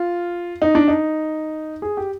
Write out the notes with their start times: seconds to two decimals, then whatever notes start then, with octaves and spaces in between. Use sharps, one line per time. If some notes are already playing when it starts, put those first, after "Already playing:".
Already playing: F4
0.62 D#4
0.75 D4
0.88 D#4
1.82 G#4
1.97 G4